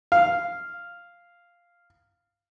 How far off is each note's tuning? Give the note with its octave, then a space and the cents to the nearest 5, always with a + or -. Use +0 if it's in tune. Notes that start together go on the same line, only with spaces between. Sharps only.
F5 -5